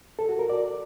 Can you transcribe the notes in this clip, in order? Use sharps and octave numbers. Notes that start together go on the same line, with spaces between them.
A4
F#4
A#4
D5